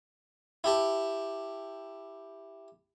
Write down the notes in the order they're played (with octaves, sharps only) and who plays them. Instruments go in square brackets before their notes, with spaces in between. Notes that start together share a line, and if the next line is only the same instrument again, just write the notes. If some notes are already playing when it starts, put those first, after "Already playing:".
[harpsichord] E4 G4 A5